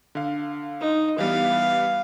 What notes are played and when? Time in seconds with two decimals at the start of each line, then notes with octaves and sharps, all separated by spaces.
0.15 D3 F5
0.80 D#4
1.18 E3 G3 B3 F5